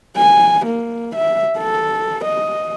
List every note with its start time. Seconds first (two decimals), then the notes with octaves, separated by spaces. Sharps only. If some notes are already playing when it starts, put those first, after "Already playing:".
0.17 G#5
0.66 A#3
1.16 E5
1.59 A4
2.25 D#5